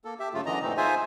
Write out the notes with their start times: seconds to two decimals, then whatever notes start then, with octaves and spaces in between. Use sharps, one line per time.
0.05 A#3 A4
0.20 G4 E5
0.34 F#2 C#3 A3 F4
0.46 F#2 D3 E3 D#5 A#5
0.62 A#2 E3 A3 C4 D#4
0.77 D#4 F4 G#4 C5 E5 G#5